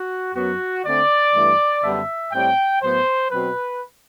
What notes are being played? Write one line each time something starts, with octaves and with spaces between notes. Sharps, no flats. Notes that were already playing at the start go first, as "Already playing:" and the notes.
Already playing: F#4
F#2 F#3 B3 F#4
D3 A3 C4 D5
G2 E3 A3
F#2 D3 G3 B3 E5
A2 G3 C4 G5
A2 F#3 B3 C5
B2 F#3 C4 B4